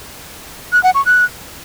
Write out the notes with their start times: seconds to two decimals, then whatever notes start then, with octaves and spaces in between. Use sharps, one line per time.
0.72 F#6
0.83 F#5
0.95 C#6
1.06 F#6